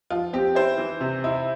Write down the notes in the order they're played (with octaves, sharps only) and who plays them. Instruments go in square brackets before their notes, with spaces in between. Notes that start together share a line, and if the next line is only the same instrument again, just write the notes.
[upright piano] F3 F4
C4 G4
E4 C5
E3
C3
E4